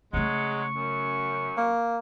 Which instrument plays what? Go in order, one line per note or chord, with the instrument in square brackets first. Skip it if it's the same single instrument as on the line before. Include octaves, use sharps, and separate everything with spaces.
[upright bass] C#3 A3 [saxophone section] F#3 G#3 [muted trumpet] C#6
[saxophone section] F#2
[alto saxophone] A#3